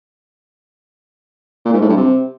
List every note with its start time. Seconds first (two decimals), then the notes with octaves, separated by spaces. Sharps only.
1.65 A#2
1.73 G#2
1.81 A2
1.89 G2
1.97 C3